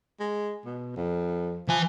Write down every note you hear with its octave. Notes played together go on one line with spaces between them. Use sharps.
G#3
B2
F2
E3 F3 G#5